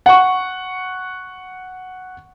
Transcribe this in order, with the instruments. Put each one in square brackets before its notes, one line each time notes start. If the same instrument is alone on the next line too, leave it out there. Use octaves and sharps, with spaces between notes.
[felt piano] F#5 C#6